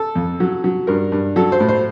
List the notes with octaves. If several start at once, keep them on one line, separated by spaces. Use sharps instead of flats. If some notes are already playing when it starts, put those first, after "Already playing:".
Already playing: A4
F2
F#3
F#3
G2 A#4
G2
F#3 A4
C5
A2
C5